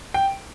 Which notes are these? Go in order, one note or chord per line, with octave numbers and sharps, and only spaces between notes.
G5